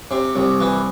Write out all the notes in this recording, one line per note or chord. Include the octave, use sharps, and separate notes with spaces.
C3
C2
E3